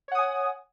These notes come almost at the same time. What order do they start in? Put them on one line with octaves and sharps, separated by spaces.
C#5 F#5 D#6 G#5